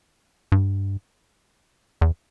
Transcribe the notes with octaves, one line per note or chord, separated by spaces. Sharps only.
G2
E2